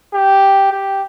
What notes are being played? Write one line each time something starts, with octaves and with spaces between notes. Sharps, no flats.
G4
G4